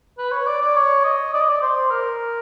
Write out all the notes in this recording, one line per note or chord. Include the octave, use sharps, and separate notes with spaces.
B4
C#5
D5
D5
C#5
D#5
D5
D#5
D5
C5
A#4